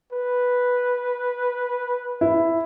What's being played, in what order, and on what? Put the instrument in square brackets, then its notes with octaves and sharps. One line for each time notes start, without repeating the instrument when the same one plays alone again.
[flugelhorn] B4
[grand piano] E4